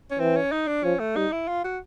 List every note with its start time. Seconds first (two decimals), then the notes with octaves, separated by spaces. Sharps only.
0.11 C#4
0.19 E3 C4
0.36 C#4
0.52 D#4
0.68 D4
0.84 F3 C#4
1.00 A3
1.16 G3 D#4
1.32 E4
1.48 F4
1.64 F#4